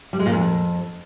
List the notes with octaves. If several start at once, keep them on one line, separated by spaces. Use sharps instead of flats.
G3
G#3
A#2
F2